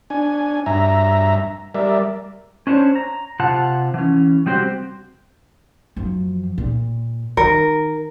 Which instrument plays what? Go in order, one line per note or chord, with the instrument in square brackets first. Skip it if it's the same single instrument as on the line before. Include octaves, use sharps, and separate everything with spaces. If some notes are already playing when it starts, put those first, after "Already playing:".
[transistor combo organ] D4 G#5
G2 E5 A#5
G3 A#4 D5 E5
[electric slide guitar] C#4 D4 C5 C#5
A#5
C3 F4 F#5 A5
E3 C#4
C3 G3 C4 F#4 G4 C5
[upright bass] F#2 F3
A#2
[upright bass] D#3 [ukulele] A#4